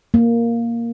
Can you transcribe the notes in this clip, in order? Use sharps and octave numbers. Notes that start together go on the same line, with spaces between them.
A#3